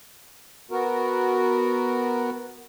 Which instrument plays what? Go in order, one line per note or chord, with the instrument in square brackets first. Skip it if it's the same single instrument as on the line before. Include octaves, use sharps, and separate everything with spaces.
[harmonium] B3 F#4 A#4